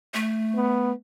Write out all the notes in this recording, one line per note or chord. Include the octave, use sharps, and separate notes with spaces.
A3
B3